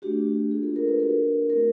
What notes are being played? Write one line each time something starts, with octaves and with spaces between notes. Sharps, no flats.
A3 D4 F#4 G4
A#3 D4 F4 G#4
A4
A#4
B4
A#3 D4 F#4 A#4
A3 C4 E4 A#4